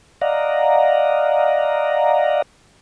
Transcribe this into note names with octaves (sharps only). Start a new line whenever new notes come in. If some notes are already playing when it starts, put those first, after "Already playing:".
D5 D#5 F5 F#5 A#5